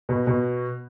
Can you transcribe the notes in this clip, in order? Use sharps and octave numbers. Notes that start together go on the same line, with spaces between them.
B2
B2